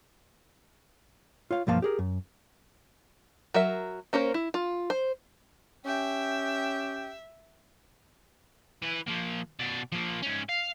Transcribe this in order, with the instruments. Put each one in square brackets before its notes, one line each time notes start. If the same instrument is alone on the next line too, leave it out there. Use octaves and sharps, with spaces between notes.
[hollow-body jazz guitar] F4 C#5 F5
B1 G2 F3 A#3 F5 A5
G4 G#4 A#4
F#2
[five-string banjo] F#3 A#4 E5
A#3 C#4 A#4 C5
E4
F4
C5
[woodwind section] C#4 G4 G5 [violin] E5
[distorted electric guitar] E3 B4
F3 A#3
B2 D5
F3 A#3
G#2 C#4
F5